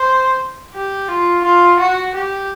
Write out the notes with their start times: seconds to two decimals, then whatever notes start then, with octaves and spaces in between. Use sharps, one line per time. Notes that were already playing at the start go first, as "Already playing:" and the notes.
Already playing: C5
0.74 G4
1.08 F4
1.44 F4
1.79 F#4
2.15 G4